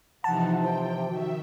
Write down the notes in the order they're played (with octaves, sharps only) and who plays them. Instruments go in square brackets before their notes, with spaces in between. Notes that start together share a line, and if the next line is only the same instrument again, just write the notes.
[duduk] C3 [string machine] E3 F3 D#4 [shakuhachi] F#5 [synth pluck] A5
[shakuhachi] C5 [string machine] G5
[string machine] D#3 E5 [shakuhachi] F#4